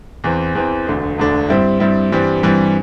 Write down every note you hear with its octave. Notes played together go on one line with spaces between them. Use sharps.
E2 E3 C4
E2 E3 C4
E1 D2 D3 A3 D4
E1 D2 D3 A3 D4
G2 G3 C4 E4
G2 G3 C4 E4
G2 E3 G3 C4
G2 E3 G3 C4